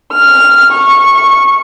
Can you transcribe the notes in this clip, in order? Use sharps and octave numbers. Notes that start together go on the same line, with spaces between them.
F6
C#6